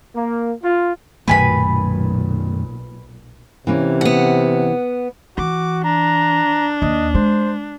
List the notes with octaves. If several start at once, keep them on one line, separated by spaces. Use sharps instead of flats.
A#3
F4
B1 F#2 A#2 D#3 A3 B4 G#5 B5
C3 E3 A#3 C#4
B3 F#5
E3 F#4 D6
D4 A#5
D#2 D#5
G#3 C5